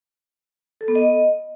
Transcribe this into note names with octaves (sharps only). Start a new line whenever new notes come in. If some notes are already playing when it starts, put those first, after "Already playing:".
A4
B3
D#5